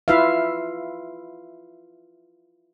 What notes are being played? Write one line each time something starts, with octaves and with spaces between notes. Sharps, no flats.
E4 F4 B4 E5 F5